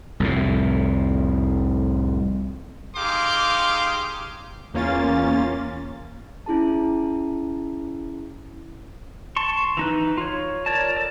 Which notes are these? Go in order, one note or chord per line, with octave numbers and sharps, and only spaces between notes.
C2 F2 A2
D#4 G4 G#4 F5 C6 D6
E2 A#3 C#4 F4 A6
C#4 E4 G#4 A5
A5 C6 C#6
E3 D#4 B4
F4 C#5
A#4 C#5 D5 A5
A4 D5